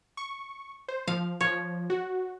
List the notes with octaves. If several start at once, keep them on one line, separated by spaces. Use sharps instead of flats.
C#6
C5
F3 F5
F3 C#5
F#4